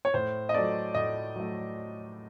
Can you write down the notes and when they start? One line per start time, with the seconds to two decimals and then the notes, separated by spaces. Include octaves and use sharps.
0.05 C#5
0.14 A2 C5
0.49 D#5
0.54 F#3 A3 D5
0.95 A2 D#5
1.36 F#3 A3